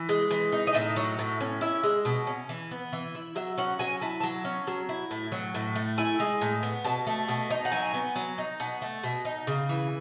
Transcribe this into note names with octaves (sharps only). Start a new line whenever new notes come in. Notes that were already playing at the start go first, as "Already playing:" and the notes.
Already playing: E3
G#3
E3
D#4
D#5
A2 E5
F#3
A2
C#4
E4 E5
G#3
B2
C#4
E3
B3
E3
E4
F#3 E5
C#4 F#5
F#3 G#5
E4 A5
F#3 A5
C#4
F#3
E4
A2
F#3
A2
A3
E4 G#5
G#3
A2
B3
B2 A5
A3
B2
D#4
F#5
F#3 G#5
B3
F#3
D#4
B2 F#5
A3
B2
D#4
C#3
E3